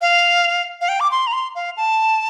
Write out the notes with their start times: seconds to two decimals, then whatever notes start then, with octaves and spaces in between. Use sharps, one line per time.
0.01 F5
0.81 F5
0.89 G5
1.00 D6
1.11 C6
1.27 A#5
1.33 C6
1.55 F5
1.77 A5